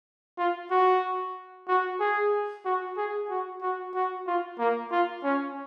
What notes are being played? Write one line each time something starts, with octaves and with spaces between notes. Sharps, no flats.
F4
F#4
F#4
G#4
F#4
G#4
F#4
F#4
F#4
F4
A#3
F4
C#4